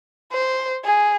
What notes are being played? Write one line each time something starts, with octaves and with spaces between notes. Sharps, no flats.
C5
G#4